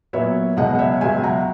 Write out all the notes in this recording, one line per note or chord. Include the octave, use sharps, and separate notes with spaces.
A#2 F#3 B3 C#5 E5
C#2 B2 F#3 D#5 F#5
F#5
C#5 E5
C#2 B2 F#3 E5 G#5
F#5 A#5